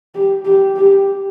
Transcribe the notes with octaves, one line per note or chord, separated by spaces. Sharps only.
G4
G4
G4